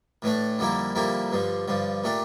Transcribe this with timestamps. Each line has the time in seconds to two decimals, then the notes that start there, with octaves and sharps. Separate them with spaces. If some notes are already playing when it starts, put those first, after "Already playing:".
0.22 A2 E3 A3 D4
0.59 F2 D3 G3 A#3 E4
0.95 F2 D3 G3 A#3 E4
1.32 G2 D3 F3
1.68 G2 D3 F3
2.04 A#2 A3 D4 G4